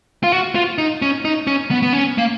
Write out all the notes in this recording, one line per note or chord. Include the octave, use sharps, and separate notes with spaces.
F4
F#4
F4
D#4
C#4
D#4
C#4
B3
B3
C#4
A#3